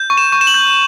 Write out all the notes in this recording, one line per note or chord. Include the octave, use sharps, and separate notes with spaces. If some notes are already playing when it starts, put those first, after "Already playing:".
Already playing: G6
C#6
E7
C#6
E7
F#7
G6